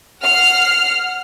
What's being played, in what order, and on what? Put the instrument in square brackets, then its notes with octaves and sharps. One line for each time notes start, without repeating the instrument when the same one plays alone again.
[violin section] F#5 F6 C7